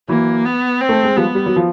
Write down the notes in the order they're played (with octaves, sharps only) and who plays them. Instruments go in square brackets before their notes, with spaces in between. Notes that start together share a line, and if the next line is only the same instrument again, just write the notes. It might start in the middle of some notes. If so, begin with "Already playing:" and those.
[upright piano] E3 F#3 [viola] A#3
[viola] B3
C4
[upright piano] A3
G#3
[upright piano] F3 G3 [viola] B3
[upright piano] G3
F#3
F3